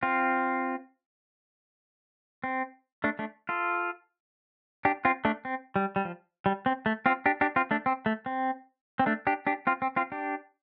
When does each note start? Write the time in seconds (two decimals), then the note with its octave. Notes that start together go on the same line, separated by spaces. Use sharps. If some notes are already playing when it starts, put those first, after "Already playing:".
0.03 C4 F4
2.44 C4
3.04 A3 D4
3.19 A3 D4
3.49 F4 A4
4.85 D4 G4
5.05 C4 F4
5.25 A3 D4
5.45 C4
5.76 G3
5.96 G3
6.05 F3
6.46 G3
6.66 C4
6.86 A3
7.06 C4 F4
7.26 D4 G4
7.41 D4 G4
7.56 C4 F4
7.71 A3 D4
7.86 C4
8.06 A3
8.26 C4
8.99 C4
9.06 A3 D4
9.27 D4 G4
9.47 D4 G4
9.67 C4 F4
9.82 C4
9.96 C4 F4
10.12 D4 G4